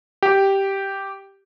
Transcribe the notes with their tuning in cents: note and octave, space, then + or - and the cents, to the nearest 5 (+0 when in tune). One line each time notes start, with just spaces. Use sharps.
G4 -5